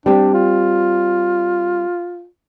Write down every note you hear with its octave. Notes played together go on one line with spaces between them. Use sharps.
G3 C4 D4
F4